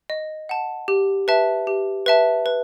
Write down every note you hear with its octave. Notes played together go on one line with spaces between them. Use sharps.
D#5
F#5 A5
G4
B4 E5 A5
G4
B4 E5 A5
B4